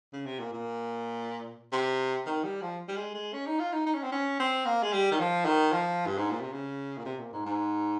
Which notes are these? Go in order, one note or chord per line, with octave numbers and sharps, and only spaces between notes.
C#3
C3
A#2
A#2
C3
D#3
G3
F3
G3
G#3
G#3
C#4
D#4
F4
D#4
D#4
C#4
C4
C#4
C4
A#3
G#3
G3
D#3
F3
D#3
F3
G2
G#2
A#2
C3
C#3
A#2
C3
A#2
G#2
G#2